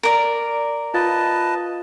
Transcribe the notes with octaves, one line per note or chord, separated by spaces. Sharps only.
A#4 D5
F4 B4 D#5 F5 A5 A6